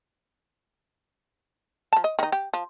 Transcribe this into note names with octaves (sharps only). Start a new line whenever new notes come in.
F3 A5
D#5
D#3 D#4
G4
F3